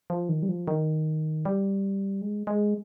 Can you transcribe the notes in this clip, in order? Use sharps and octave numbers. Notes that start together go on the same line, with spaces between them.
F3
D#3
G3
F3
D#3
G3
G#3
G#3